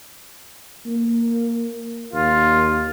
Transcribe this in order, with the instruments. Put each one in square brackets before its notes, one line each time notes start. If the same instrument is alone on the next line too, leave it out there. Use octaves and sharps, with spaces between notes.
[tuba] A#3
[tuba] D#2 [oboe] F4